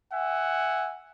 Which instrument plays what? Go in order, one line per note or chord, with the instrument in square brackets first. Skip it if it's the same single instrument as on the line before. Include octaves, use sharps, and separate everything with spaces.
[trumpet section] E5 F#5 G#5